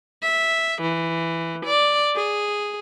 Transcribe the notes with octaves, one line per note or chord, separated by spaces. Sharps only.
E5
E3
D5
G#4